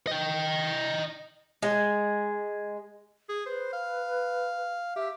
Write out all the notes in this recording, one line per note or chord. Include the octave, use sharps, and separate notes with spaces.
D#5 G5
G#3
G#4
B4 C5
F5
G4 E5